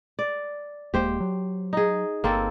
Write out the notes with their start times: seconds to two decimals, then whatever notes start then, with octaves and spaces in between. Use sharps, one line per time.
0.19 D5
0.94 D#1 G#3 A#3 G4 C5
1.20 F#3
1.73 D#4 G#4
2.24 G1 A#3 C4 A4